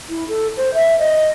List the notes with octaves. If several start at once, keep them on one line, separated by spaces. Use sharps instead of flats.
E4
A4
C5
E5
D#5